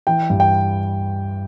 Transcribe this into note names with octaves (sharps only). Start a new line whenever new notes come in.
E3 G5
G2
G5